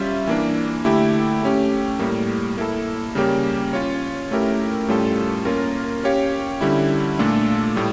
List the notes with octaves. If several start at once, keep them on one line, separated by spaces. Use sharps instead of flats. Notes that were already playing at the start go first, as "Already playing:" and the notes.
Already playing: G3 C#4 F4 E5
E3 A#3 D4
D3 A3 E4 G4
A3 C#4 G4
A2 G3 A#3
A#3 E4 A4
C#3 G3 A#3 C#4 G4
C#4 F4 C#5
A3 C#4 E4 G4 A#4
A2 G3 C#4 F4 A4
A#3 C#4 F4 A#4
C#4 G4 C#5 F5
D3 G3 C#4 E4
A#2 A3 D4 F4 A4
A2 G3